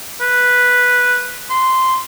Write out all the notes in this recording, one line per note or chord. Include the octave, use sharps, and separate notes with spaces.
B4
C6